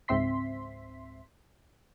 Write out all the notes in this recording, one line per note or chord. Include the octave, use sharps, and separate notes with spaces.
C#2 G#2 C4 E5 C6 B6